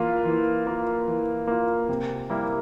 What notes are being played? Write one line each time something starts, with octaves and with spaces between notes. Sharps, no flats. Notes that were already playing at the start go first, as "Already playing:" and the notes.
Already playing: E3 A#3 F4
E3
A#3 F4
E3
A#3 F4
C3
G3 A#3 E4